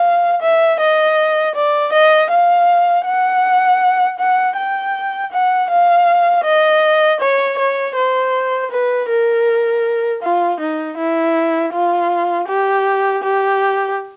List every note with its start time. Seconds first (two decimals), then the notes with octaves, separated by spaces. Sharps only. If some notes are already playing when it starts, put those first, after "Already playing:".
Already playing: F5
0.42 E5
0.80 D#5
1.55 D5
1.93 D#5
2.30 F5
3.06 F#5
4.19 F#5
4.56 G5
5.32 F#5
5.70 F5
6.44 D#5
7.20 C#5
7.59 C#5
7.96 C5
8.71 B4
9.09 A#4
10.22 F4
10.60 D#4
10.97 E4
11.73 F4
12.48 G4
13.23 G4